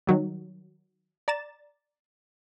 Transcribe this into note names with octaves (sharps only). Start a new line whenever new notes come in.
D#3 F#3 G3
D5 A#5 A6 E7